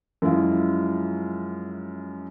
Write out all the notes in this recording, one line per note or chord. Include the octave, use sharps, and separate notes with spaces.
F#2 F3 G#3 E4 F4